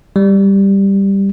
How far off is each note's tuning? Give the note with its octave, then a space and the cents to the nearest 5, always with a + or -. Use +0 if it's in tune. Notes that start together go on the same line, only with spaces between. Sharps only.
G3 +5